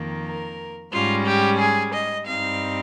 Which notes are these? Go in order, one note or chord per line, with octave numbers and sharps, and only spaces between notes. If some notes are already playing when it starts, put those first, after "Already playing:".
Already playing: F2 D#3 A#3
A#4
G#2 G3 C#4 F4
G4
G#4
D#5
G2 G3 C4 D#4 F5